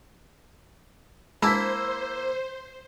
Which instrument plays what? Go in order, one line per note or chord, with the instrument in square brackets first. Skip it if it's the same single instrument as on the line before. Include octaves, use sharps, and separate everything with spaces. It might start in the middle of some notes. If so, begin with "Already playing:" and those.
[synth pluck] G#3 A5 [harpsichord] A#3 E4 [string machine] C5 [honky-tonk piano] E6 B6